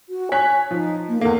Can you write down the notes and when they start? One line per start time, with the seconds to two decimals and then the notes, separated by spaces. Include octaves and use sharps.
0.09 F#4
0.32 C#5 G#5 F#6 B6
0.71 F3 D#4
1.09 A#3
1.21 E2 A#3 A4